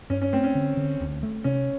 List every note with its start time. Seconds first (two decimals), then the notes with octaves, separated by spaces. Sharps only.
0.10 G2 C#4
0.22 C#4
0.33 A3 C4
0.44 C#4
0.55 D3
0.77 D3
1.00 D2
1.23 A3
1.44 C3 C#4